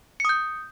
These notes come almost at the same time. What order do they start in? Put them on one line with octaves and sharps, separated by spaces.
C#7 D#6 G6